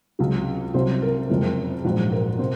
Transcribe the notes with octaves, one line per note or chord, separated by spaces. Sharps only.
C#2 C3 F#3
C2 C3 F#3 C5
A#4
F#1 F2 C3 F3 G#3
A#1 G#2 F#3 F#4
A#4
C3 C5